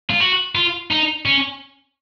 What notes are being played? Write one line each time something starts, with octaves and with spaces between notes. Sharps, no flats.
F4
F#4
F4
D#4
C#4